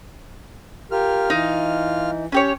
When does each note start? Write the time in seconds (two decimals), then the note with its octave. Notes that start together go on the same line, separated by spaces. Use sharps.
0.91 F4 G4 A#4 F6
1.30 E3 D#4
2.32 C#4 G4 C#5